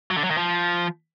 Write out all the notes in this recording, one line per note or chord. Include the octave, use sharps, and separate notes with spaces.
F#3
D3
F#3
D#3
F3